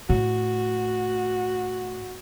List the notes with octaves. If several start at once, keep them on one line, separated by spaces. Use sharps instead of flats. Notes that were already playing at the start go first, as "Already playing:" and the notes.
A2 F#4